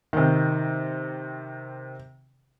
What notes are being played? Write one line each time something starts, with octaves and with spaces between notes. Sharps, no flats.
C3 D#3